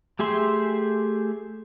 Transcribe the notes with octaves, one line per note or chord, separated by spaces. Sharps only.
A3 G4 G#4 E5 C6